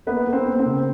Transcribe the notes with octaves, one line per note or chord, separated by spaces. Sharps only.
A#3 B3 B4
A#3
C4 C5
A#3
C4 C5
C#3